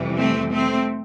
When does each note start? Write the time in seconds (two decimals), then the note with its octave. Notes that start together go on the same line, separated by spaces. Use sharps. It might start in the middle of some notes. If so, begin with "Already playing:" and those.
Already playing: F2 C3 E3 G3
0.18 A3 C4
0.53 A3 C4